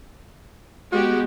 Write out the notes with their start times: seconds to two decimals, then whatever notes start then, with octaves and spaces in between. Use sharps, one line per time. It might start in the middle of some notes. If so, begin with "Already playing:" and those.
0.92 G#3 B3 F#4 G4